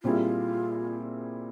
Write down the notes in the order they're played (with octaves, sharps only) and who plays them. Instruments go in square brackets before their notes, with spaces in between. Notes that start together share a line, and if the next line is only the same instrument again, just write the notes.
[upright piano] A#2 G3 C4 E4 G#4 [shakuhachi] F4